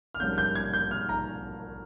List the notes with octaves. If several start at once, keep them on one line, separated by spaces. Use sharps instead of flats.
F6
A#1 G#2 G3 A#3 C#4 G6
G6
G#6
G6
F6
A#5